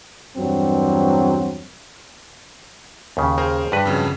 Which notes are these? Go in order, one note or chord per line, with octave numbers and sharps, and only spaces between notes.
E2 G2 F#3 C4
D#2 C#3
G#4 A#4 C5
G2 G3 B4
F2 C#3 F#3